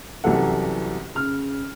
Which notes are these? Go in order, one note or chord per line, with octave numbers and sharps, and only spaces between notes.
C2 F#2 C3 E3 A4 F#5
C#3 F6